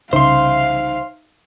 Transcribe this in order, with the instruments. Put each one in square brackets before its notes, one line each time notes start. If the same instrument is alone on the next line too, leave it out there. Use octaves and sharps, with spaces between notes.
[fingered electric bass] C2 C#3 [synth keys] D#4 E5 [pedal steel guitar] C5 C6 [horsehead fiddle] F5